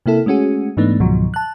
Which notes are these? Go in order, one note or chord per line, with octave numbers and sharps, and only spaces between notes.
C3 A#3 E4 A4
G#3 A3 C#4 F#4 G#4
G#2 E3 A3 B3 D4 D#4
C#2 G#2 B2 D#3 F3 F#3
A5 F#6